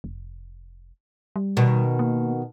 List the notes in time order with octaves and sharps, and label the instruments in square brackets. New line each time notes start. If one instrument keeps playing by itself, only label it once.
[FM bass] F1
G3
[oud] B2 D#3
[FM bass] A#3